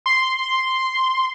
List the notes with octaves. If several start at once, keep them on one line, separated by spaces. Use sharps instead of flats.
C6